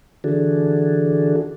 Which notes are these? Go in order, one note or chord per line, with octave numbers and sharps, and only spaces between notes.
D3 E3 D4 F#4 G#4 A4